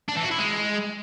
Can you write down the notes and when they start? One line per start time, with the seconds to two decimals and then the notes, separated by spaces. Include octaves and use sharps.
0.09 D4
0.16 E3
0.24 F#4
0.31 E4
0.39 G#3